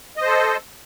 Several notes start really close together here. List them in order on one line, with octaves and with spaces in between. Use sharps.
D#5 C5 A4